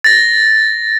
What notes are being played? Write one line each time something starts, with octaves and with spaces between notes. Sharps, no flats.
A6 A#6